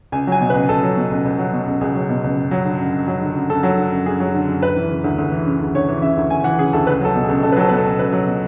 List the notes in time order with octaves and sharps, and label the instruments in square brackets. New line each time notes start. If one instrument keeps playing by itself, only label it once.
[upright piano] C#2 G#5
F#3 G#5
B2
B4
C#2
C#2 A4
F#3
B2
C#2
C#2
F#3
B2
C#2
C#2 G#4
F#3
B2
C#2
F#2
F#3
D3
F#2
F#2
F#3
D3
F#2
F#2 A4
F#3
D3
F#2
F#2 G#4
F#3
D3
F#2
D2 B4
E3
C#3
D2
D2
E3
C#3
D2
D2 C#5
E3
C#3 E5
D2
D2 G#5
E3 F#5
C#3 G#4
D2 A4
C#2 B4
F#3 A4
B2
G#4
C#2
C#2 A4
B4
F#3 A4
B2 B4
A4
C#2
C#2 B4
F#3
B2